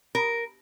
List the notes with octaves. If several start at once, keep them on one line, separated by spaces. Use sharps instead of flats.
A#4